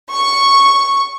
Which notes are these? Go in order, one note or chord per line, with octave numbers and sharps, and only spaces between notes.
C#6